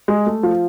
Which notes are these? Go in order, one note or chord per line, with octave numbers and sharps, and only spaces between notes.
G#3
A3
F3